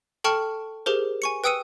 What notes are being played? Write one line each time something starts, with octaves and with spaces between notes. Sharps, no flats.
A4 G5 A5 C#6 F6 C#7
G4 G#4 A#4 C5
G#5 C#6 C#7
B4 G5 D#6 E6 C#7 D#7